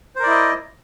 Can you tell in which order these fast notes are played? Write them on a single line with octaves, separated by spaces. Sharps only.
C5 A#4 D5 E4 D#5